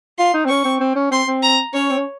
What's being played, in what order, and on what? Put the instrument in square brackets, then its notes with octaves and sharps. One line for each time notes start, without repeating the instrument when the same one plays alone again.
[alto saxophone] F4 [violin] C6
[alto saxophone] D#4
C4
[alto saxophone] C#4 [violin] C#6
[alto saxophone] C4
C4
C#4
[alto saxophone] C4 [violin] C6
[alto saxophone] C4
[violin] A#5
[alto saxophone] C#4 [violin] C#5
[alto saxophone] C4
C#4